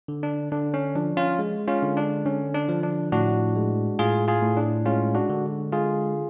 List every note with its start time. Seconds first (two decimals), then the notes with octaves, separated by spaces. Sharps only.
0.08 D3
0.23 D4
0.52 D3 D4
0.74 C#4
0.95 F3 D4
1.17 C#4 F4
1.39 G#3
1.68 C#4 F4
1.82 D3
1.97 D4
2.26 D3 C#4
2.54 D4
2.69 F3
2.83 D4
3.12 A2 D4 F#4
3.55 G#3
3.99 A2 F4 G#4
4.28 F4 G#4
4.42 A2
4.57 D4
4.86 G#3 C#4 F4
5.15 D4 F#4
5.29 D3
5.72 G#3 F4 G#4